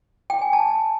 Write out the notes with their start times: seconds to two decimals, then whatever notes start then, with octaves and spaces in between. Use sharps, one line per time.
0.30 G5
0.41 G#5
0.53 A5